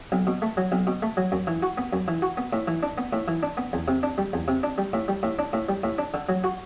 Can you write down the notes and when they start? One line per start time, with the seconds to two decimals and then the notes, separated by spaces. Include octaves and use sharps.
0.12 B1
0.27 B2
0.42 A3
0.57 F#3
0.72 B1
0.87 B2
1.03 A3
1.17 F#3
1.32 F#2
1.47 E3
1.63 F#4
1.78 B3
1.93 F#2
2.08 E3
2.22 F#4
2.37 B3
2.53 A2
2.68 E3
2.83 D4
2.98 B3
3.13 A2
3.28 E3
3.43 D4
3.57 B3
3.73 E2
3.88 C3
4.03 D4
4.18 G3
4.33 E2
4.48 C3
4.63 D4
4.78 G3
4.93 A2
5.08 G3
5.23 A2
5.39 D4
5.53 A2
5.69 G3
5.84 A2
5.98 D4
6.14 D3
6.29 F#3
6.44 F#4